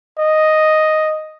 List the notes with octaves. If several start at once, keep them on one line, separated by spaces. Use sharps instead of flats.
D#5